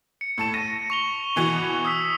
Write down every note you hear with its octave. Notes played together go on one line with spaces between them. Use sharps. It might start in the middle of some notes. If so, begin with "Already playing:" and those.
C#7
A2 A4 E7
A#6 D#7
C#6 F7 G7
B2 E3 B3
D#6 E6 B6